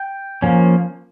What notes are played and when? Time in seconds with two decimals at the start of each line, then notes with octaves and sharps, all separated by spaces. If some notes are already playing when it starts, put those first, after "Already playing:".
Already playing: G5
0.42 F3 A#3 C#4